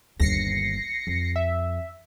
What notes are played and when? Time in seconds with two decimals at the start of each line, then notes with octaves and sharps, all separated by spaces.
0.20 G1 D#2 A#6 C7 C#7
1.07 F2
1.36 E5